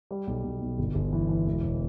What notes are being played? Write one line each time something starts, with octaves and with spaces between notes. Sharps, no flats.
G3
B1
B1
B1
G1
G1
E3
E3
E1
E1